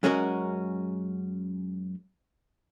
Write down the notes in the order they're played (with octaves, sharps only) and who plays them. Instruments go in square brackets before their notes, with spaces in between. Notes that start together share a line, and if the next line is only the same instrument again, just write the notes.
[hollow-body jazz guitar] F#2 G#3 C#4 F#4 A#4